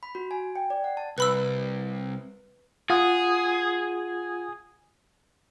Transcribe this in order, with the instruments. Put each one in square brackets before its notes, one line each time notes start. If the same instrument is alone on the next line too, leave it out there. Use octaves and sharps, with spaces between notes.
[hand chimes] B5
F#4
G#5
G5
D5
F#5
A5
[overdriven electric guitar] C2 [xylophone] B4 B5 E6
[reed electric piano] F4 F#5 D#6 [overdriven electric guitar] G#4